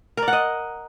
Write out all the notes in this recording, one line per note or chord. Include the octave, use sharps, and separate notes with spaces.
A#4
D5
F#5
D#5